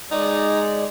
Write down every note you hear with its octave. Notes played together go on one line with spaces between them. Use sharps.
G#3 D#4 D5